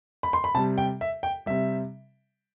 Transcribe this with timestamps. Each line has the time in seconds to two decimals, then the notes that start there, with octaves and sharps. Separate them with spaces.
0.23 B5
0.33 C6
0.44 B5
0.55 C3 A5
0.57 G3
0.78 G5
1.01 E5
1.23 G5
1.46 C3 G3 E5